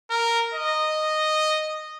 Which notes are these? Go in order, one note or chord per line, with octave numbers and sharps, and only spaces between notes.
A#4
D#5